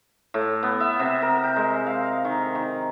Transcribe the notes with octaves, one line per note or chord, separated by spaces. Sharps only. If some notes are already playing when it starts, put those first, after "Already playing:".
A2
B3
E5
C3
A#4
G5
G#3
F5
D#3
D#3